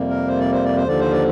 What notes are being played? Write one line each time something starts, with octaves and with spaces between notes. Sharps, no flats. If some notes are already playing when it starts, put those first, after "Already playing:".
Already playing: F2 C3 G3 A#3
A#4
C5
D5
C5
D5
C5
D#2 D3 F3 D5
C5
D5